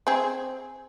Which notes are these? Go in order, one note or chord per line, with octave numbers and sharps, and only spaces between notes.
C4 G#4